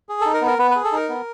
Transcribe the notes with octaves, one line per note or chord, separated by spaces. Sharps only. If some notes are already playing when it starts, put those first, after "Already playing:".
G#4
D#4 A4
A#4
B3
A#4
B3 B4
G#4 B4
A4
D#4 A#4
B3